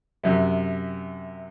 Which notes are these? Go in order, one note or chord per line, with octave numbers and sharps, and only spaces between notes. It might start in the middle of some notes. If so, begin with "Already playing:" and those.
F#2 C3